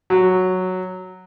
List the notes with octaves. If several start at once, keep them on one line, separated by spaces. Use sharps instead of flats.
F#3